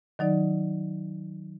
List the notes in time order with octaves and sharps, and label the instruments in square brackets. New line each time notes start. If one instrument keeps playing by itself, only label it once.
[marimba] D#3 F#3 D#4 D5